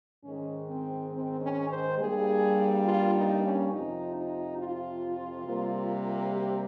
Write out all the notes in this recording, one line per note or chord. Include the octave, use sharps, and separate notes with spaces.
G#2 D#3 G#3 C#4
C4
C4
C#4
C5
G2 G3 A#3 G#4
F4
D#4
C#4
F2 C3 F3 D#4
D#4
F4
C3 G3 A#3
G4